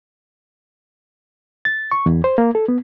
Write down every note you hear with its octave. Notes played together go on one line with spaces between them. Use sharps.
A6
C#6
E2
C5
A#3
A4
B3